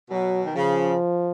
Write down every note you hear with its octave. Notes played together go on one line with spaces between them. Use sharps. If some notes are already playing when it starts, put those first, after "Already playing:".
B2 F#3
D#3
C#3 F3